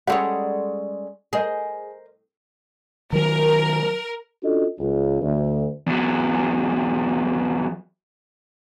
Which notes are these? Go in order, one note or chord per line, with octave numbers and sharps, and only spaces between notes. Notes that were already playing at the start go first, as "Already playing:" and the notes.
G3 G#3 C#4 A4 C#5 F#5
G#4 A#4 C5 D#5
D#3 F#3 A#4
C#4 D4 F4 F#4 A4 D#5
C#2
D2
E2 F#3